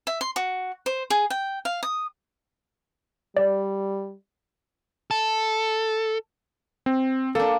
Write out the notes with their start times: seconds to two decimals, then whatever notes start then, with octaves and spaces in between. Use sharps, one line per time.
0.07 E5
0.21 C6
0.36 F#4
0.86 C5
1.10 G#4
1.30 G5
1.65 F5
1.83 D#6
3.37 G3 D5
5.11 A4
6.86 C4
7.35 A#3 D4 A4